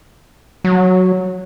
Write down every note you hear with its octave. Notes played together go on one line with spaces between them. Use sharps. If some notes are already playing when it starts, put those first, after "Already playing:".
F#3